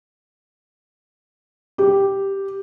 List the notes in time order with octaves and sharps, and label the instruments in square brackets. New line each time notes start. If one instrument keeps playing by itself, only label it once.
[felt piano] G4